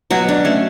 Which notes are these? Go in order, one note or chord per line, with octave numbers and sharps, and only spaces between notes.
B2 F#3 F#4
D4
A3 C#4